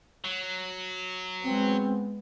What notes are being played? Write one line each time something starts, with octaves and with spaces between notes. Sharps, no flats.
F#3
G#3 B3 C4